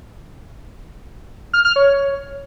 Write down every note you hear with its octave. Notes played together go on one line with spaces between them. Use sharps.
F6
F6
C#5